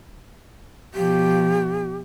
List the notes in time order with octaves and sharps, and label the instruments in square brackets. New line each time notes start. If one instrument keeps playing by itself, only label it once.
[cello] B2 F3 [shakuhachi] G4